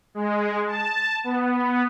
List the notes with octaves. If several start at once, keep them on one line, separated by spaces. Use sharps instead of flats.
G#3
A5
B3